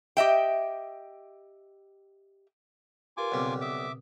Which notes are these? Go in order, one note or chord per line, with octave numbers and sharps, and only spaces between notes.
G4 D#5 E5 G5
F4 G4 A#4 B4 G#5 D6
B1 C#3 G3 C4
B2 E5 D6 D#6
D#6